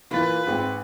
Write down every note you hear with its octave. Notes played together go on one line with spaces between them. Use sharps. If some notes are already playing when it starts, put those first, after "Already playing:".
A#2 E3 A#3 E4 F4 B4 A6
G#1 C4 G#4